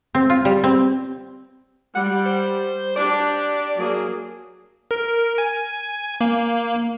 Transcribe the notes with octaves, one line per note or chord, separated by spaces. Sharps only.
C4
F4
G3
C4
G3 F#5
C5
D4 G4 D5
F#3 A#3 G#4
A#4
G#5
A#3